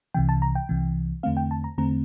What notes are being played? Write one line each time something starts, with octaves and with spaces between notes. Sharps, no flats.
C2 C3 E3 G5
A5
A#5
G5
C2 C3 E3
E2 D3 A3 C4 F5
G5
A5
A#5
E2 D3 A3 C4 A#5